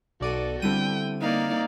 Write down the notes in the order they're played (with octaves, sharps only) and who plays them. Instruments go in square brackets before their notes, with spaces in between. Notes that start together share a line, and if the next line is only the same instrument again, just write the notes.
[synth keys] B1 D5 D#7 [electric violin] F#4 A4
[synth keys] D3 E4 D#7 [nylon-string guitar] G3 B3 C4 [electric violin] G5
[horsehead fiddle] A#3 D#4 [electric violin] D5 F5